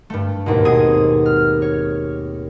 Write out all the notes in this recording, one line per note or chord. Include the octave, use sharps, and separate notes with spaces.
G2 A3
D#2 G#2 B2
B2 C4 G#4 D#6
F6
C#5